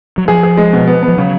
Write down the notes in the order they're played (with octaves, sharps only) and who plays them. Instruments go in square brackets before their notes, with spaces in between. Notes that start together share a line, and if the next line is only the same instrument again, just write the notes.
[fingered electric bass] F#3
[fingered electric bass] F3 [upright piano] G#4
[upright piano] G#4
G#3
B2
B3
B3
[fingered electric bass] F3
[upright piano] C#3 [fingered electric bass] F#3